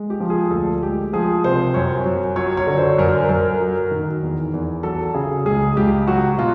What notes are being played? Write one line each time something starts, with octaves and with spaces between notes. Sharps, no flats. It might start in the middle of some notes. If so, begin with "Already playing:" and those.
Already playing: G#3
G4
F3
G#4
D2 A4
G#3 G4
F3 G#4
C3 C5
F#2 C#5
F#2
F#3 C#5
C#5
D3
C5
F#2 A#4
F#2 A#4
F#3
D#3
E2
E2
F#3 A4
C#3 G#4
C#2 G#4
C#2 G4
F#3 F#4
B2 F4